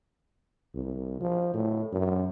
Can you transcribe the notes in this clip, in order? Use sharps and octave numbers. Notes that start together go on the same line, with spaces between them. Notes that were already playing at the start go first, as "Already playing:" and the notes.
C2
F3
A2
F#2